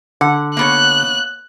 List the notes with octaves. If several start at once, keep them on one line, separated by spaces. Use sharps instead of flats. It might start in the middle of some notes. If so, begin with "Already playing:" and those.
D3 F#5
A#3 B3 C#5 F#6